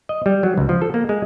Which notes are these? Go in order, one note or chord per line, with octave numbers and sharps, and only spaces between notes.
D#5
G3
F#3
C#2
F3
A4
A#3
G#3